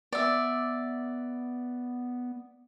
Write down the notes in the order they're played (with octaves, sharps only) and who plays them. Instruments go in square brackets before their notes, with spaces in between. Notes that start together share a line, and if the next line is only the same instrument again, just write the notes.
[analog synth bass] B3 [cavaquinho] D5 E5